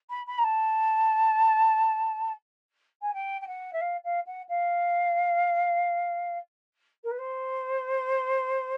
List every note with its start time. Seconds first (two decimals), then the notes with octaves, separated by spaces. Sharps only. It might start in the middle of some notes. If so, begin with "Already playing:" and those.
0.10 B5
0.27 B5
0.38 A#5
0.44 A5
3.02 G#5
3.14 G5
3.41 G5
3.47 F#5
3.73 E5
3.81 F5
4.04 F5
4.27 F#5
4.49 F5
7.04 A#4
7.11 B4
7.19 C5